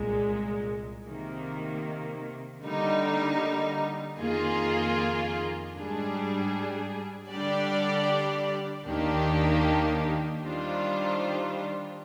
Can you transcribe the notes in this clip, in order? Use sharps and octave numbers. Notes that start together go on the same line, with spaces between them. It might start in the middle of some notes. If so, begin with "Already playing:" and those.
Already playing: C2 A#2 G#3
C3 D#3 A#3
D3 G3 A#3 D#4
F2 D#3 A#3 F4 G#4
G#2 G3 D4 G#4
D3 G3 D4 G4 D5
D#2 D#3 A#3 D4 G4
D#3 G3 D4 F4 C5